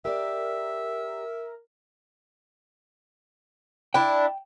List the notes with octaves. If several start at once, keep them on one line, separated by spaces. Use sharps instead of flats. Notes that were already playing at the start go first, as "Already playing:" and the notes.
G4 A#4 D5 E5
D4 E4 G5